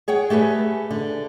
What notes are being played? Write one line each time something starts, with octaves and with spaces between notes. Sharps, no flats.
G#4 C#5 F#5 G5
A3 G4 G#4 B4
D3